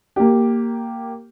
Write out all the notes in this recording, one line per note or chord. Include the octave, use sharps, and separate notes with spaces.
A#3 G4